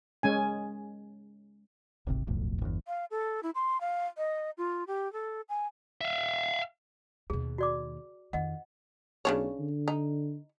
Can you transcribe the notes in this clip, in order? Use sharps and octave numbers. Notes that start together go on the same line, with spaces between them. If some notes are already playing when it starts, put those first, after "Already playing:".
G#3 C#4 G#5
D1 G#1 C3
D#1 B1 F2 A2
G1 E2
F5
A4
E4
C6
F5
D#5
F4
G4
A4
G#5
E5 F5
D#2 B2 G#4
F#4 D5 D6
F2 D#3 D#5 F#5
B1 C#3 D4 C#5
D3
D#4